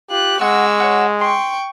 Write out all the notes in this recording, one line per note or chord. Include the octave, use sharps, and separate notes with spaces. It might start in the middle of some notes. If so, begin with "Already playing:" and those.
F4 G4 F#6
G#3 F#4 C#6 E6
F#4 C#5
G5 C6 C#6